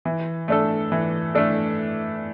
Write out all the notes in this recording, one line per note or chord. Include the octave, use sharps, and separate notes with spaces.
E3
A3 D4 A4
E3
A3 D4 A4